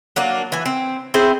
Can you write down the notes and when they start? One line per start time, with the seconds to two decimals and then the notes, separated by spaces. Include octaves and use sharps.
0.16 F#3 A#3 D4
0.52 E3 G#5
0.66 C4
1.14 C4 E4 G#4 C5